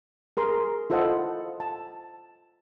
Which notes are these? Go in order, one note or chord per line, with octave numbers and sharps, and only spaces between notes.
G#4 A#4 C6
E4 F4 A4 C5 D#5 F#5
A5